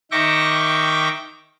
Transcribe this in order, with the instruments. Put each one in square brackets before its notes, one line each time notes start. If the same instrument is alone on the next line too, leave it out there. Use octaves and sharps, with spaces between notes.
[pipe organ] D#3 E5 G5 C#6 D6 A#6